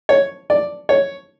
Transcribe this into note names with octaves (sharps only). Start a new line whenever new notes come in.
C#5
D5
C#5